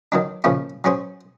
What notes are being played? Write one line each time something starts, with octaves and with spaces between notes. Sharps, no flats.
D#3 F#3 D4
A#2 C#3 F3 C#4 E4
F#3 C#4 G#4 C5